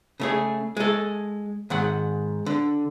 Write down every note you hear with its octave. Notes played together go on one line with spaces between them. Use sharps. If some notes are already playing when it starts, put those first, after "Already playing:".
C#3 A3 G#4
G#3 A4
G#2 D#3 F#5
D3